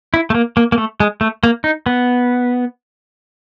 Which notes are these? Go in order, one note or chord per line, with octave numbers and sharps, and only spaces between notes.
E4
A3
A#3
A#3
A#3
A3
G#3
A3
A#3
D#4
B3